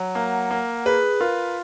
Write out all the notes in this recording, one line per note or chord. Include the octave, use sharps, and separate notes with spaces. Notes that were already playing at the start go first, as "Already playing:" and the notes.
Already playing: F#3
A#3 F#5
A#3
G#4 B4
F4 A#4